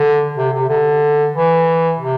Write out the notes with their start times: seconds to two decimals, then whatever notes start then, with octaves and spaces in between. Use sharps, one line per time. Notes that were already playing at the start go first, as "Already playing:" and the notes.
Already playing: D3
0.37 C3
0.53 C3
0.69 D3
1.34 E3
1.99 C3